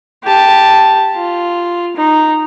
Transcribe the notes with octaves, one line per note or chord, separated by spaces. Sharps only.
G4 A5
F4
D#4